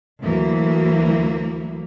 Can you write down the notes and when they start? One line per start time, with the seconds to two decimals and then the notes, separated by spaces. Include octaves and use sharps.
0.22 D2 E3 F#3 A#3